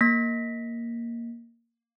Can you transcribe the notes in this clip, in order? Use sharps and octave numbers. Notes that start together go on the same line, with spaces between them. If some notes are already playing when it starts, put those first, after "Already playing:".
A#3 A#6 B6